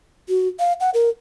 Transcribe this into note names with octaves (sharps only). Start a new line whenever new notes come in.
F#4
F5
F#5
A#4